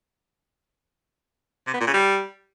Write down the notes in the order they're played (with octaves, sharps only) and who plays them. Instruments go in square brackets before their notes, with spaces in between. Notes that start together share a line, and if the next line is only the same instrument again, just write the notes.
[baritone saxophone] C3
B3
A#2
C#3
G3